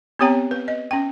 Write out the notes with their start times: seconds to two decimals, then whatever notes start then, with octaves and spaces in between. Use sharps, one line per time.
0.19 B3 C4 G4 C#5 G5 A#5
0.51 B4
0.68 D#5
0.91 C#4 G5